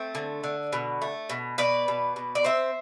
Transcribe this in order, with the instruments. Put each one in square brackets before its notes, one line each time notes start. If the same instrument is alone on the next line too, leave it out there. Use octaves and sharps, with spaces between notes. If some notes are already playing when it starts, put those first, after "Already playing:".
Already playing: [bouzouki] A3 C4
D3
D3
B2
A3
B2
B2 B4 D5
B2
B2
D5
C4 C5 E5